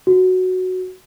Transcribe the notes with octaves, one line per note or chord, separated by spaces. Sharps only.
F#4